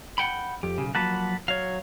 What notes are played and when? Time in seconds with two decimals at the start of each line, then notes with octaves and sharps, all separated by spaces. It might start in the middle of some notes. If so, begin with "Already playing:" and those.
0.18 F#5 G5 B5
0.63 F2 G4
0.78 B1 C#3
0.95 F3 F#3 A#3 F#5 A5 B5
1.48 F#3 C#5 F5